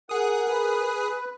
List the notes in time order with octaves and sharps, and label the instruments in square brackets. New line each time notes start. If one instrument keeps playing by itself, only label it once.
[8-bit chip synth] G#4 D#6 [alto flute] A#4 [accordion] F#5
[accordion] B4